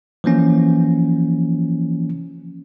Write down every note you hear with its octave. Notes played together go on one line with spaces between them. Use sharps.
E3 F3 A#3 C#4